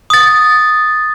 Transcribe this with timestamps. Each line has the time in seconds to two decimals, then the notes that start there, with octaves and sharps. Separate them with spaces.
0.10 D#6 A6